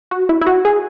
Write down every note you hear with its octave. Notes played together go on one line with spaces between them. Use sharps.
F#4
E4
E4
F#4
G#4